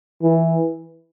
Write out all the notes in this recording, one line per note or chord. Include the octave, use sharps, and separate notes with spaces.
E3